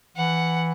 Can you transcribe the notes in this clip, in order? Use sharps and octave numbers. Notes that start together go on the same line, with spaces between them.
E3 F#5